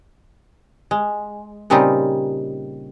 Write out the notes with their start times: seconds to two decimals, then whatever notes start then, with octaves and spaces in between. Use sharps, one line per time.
0.91 G#3
1.70 A#2 C#3 G3 C4 D#4 F4